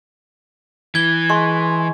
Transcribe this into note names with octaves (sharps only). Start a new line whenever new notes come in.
E3 G#6 G7
G#3 C#6